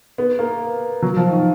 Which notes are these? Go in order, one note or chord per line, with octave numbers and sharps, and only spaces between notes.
B3
A#3
F#3
F3
D#3